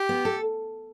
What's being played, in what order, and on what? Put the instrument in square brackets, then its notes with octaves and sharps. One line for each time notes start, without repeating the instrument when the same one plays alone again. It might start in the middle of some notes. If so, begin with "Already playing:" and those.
Already playing: [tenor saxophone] G4
[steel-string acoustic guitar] B3
A4